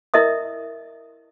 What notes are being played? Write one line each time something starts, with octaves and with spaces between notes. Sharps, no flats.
E4 A#4 D#5 E5 D#6